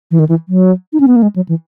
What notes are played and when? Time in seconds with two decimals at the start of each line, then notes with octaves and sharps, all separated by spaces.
0.11 E3
0.19 D#3
0.29 E3
0.49 F#3
0.93 D#4
1.00 C#4
1.07 B3
1.16 A#3
1.22 G#3
1.36 F#3
1.49 E3